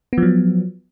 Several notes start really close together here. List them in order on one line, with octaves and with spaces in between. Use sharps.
B3 F3 F#3